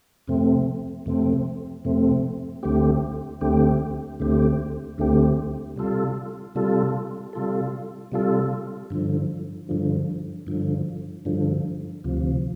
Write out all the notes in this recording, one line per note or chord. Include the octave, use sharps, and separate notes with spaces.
F2 C3 A3 C4
F2 C3 A3 C4
F2 C3 A3 C4
D2 D3 A3 C4 G4
D2 D3 A3 C4 G4
D2 D3 A3 C4 G4
D2 D3 A3 C4 G4
C3 G3 F4 A4
C3 G3 F4 A4
C3 G3 F4 A4
C3 G3 F4 A4
G2 D3 F3
G2 D3 F3
G2 D3 F3
G2 D3 F3
D2 C3 F3